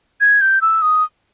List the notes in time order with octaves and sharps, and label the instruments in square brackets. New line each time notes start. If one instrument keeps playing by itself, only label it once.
[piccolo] G#6
G6
E6
D#6